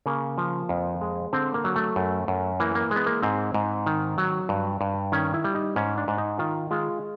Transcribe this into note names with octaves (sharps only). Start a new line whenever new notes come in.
C#3 A#3
F3
F2
G#3
D3 C4
A#3
F#3
A3
F#2
F#2
E3 A#3
A#3
G#3 B3
A#3
G#2 C4
G#2
D#3
F#3
G2
G2
D#3 C#4
E4
G3
D#4
G#2 C#4
D4
G#2
D#4
D#3 F4
G#3 F4